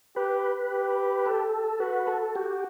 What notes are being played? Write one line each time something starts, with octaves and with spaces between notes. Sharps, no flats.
G4 B4
G4
A4
F#4 B4
A4
F#4 G4